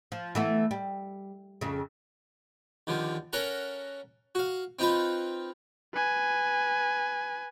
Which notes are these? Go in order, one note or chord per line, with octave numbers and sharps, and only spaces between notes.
F3
E3 A3 B3
G3
F2 C#3
D#2 D3 F3
C#4 A4 A#4 F#5 A#5
F#4 F5
C4 D#4 F4 B4
B4 G#5